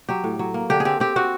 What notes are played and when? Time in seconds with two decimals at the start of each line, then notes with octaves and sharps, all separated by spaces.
0.09 F#3 G4
0.24 A2
0.39 F#3
0.54 A#3
0.70 D3 G4
0.80 G#4
0.85 C4 G4
1.00 C4 G4
1.16 C4 F#4